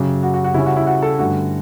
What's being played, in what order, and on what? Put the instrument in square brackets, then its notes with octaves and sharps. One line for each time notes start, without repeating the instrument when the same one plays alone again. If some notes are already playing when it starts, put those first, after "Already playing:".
Already playing: [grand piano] F#2 C#3 F#3 [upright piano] G4
[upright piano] F#4
F#4
F#4
[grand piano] C#3 G3 C#4 [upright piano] E4
[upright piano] F#4
E4
F#4
A4
[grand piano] G2 D3 A3 C#4 [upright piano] F#4